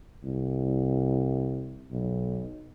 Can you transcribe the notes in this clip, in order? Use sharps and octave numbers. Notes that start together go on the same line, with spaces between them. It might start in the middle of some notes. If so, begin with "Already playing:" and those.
C2
B1